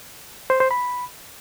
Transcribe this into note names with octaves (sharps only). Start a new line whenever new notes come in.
C5
C5
B5